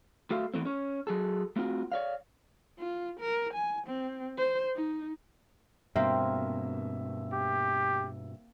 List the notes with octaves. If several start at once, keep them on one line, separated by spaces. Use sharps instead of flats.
A3 F#4 A4 E5 F5
E2 G2 E3 A3 C4
C#4 C#5
F#3 G#4 A4
A3 C4 F4 F#4
C#5 D5 F5
F4
A#4
G#5
C4
C5
D#4
G2 B2 A#3 C4 E5
G4